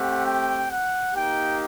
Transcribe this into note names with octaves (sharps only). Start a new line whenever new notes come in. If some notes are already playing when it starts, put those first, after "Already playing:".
Already playing: A3 C4 G4 F#5
G5
F#5
A#3 D#4 G4 G5